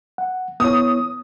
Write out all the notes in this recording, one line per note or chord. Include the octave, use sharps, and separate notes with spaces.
F#5
B3 E4 C#5 D#6